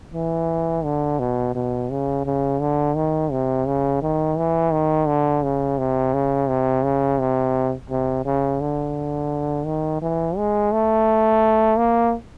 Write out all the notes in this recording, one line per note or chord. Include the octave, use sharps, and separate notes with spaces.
E3
D3
B2
B2
C#3
C#3
D3
D#3
C3
C#3
D#3
E3
D#3
D3
C#3
C3
C#3
C3
C#3
C3
C3
C#3
D3
D#3
E3
G#3
A3
A#3